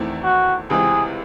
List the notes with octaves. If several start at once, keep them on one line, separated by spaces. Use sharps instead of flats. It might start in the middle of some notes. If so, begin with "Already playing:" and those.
Already playing: E2 D#3 A3 C4 E4
F#4
C#2 C3 E3 C4 G#4